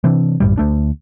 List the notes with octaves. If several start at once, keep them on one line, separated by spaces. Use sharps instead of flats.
C3 E3 C4 D4
A#1 F#2 A2 G3
D2 A3 D4